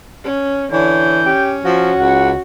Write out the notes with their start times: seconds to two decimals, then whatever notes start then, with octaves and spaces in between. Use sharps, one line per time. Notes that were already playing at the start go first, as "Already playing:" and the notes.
0.24 C#4
0.72 D3 E3 C#5 G6
1.26 C#4 G4
1.65 F3 F#4
1.98 C#2 F#5